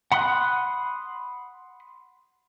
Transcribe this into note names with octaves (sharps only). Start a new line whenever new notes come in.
F#5 B5 C6 D#6 F#6